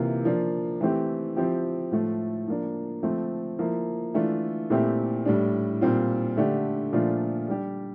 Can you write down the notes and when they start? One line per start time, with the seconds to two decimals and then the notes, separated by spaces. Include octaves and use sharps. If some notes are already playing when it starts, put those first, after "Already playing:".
Already playing: C3 E3 A#3 F4
0.25 F3 A#3 D4
0.81 E3 A3 C4 G4
1.36 F3 C4 E4 G4
1.91 A2 F3 A3
2.48 F3 A#3 D4
3.03 F3 A3 C4
3.59 F3 A#3 E4
4.14 E3 A3 D4 F4
4.70 A#2 A3 C4 E4 G4
5.25 A2 G3 D4
5.81 A#2 G3 C4 F4
6.37 D3 A3 D4 G4
6.92 A#2 F3 A3 D4 F4
7.48 G3 D4 G4